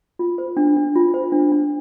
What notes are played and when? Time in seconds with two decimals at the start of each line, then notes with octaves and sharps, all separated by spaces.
0.19 F4
0.38 C5
0.57 D4
0.76 D4
0.96 F4
1.14 C5
1.32 D4
1.52 D4